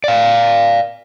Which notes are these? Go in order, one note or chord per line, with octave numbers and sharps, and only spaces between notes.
D5 F5